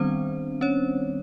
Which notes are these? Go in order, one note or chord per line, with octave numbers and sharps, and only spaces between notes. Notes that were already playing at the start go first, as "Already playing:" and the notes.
Already playing: D#3 G3 B3 C4 D4 C5
C#4 C#5